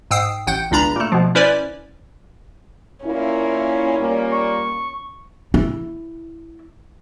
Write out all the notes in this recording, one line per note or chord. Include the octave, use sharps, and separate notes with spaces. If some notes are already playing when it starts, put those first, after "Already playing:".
G#2 G5 D#6 E6 C7
A1 F#5 G5 G6
G1 C#2 D4 A#5 B5
A#2 A3
B2 F3
C#4 E4 B4 C5 D5
A#2 A#3 C#4 E4
A#2 G3 A#3
C#6
E4